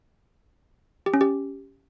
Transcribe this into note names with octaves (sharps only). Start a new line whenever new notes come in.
G4
C#4
G4